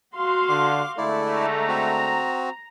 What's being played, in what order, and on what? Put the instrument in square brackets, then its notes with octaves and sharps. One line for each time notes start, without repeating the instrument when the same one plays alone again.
[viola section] F#4 F5 C6
[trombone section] D3 [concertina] D6
[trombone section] D3 G#3 A3 [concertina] E4 D5
[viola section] A#5
[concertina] C4 F#4